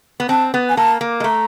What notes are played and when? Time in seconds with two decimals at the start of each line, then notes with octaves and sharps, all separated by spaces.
0.20 B3
0.29 C4 A5
0.54 B3
0.69 G#5
0.77 A#3 A5
1.01 A#3
1.20 G#3
1.24 A3 A#5